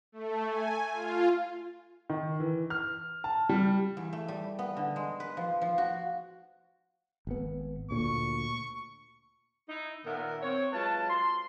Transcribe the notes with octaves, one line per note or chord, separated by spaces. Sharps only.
A3
G#5
F4
D#3
E3
F6
A5
G3
E2
A3
G3
B3
D3
G#3
B4
F3
F3
F#4
G#1 B3
D2 A#2 C#6
D#4 E4
A#2 D#3 B3 A#4 E5 F#5
C4 C#5
F#3 G#3 F4 B4 A5
C6